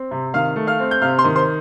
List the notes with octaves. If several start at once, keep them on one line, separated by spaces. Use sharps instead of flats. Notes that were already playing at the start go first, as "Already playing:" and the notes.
Already playing: C4
C3
D#3 F5 F6
A3
F5 F6
C4
G6
C3 F5 F6
C5 C6
D#3
C5 C6